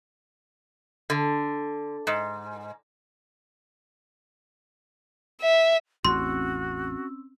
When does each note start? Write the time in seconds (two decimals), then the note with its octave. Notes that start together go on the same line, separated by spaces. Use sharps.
1.10 D3
2.07 G#2
5.41 E5
6.05 A1 E2 C4 C#4 F#4 C6 E6